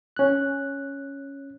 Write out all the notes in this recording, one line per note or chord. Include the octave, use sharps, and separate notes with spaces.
C#4 F#6